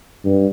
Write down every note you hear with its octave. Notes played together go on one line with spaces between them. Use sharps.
G2